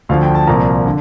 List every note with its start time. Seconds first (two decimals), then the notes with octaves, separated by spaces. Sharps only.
0.09 D2 D3 F3 F5
0.22 G5
0.35 A5
0.47 C2 A#2 F3 A#5
0.86 D3